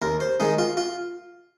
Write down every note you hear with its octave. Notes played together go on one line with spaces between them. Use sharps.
D#2 A#4
C5
D#3 G#3 D#4
F4
F4